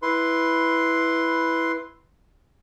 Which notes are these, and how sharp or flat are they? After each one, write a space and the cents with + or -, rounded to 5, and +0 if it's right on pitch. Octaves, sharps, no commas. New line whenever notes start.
E4 +0 B4 +0 C6 +0